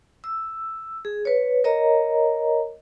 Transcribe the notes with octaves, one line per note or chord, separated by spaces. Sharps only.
E6
G#4
B4 C#5
A#4 C#5 D#5 A#5